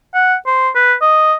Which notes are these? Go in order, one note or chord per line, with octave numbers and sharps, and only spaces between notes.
F#5
C5
B4
D#5